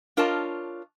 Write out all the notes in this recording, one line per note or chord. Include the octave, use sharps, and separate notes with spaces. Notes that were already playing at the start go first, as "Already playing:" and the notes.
D4 F4 A#4 C#5 D#5 A5